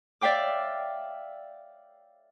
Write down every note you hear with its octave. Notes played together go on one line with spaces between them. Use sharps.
D5 E5 F5 G5 D6